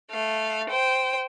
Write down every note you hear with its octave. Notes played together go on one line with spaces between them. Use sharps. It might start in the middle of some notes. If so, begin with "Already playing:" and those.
A3 F5
C5 G5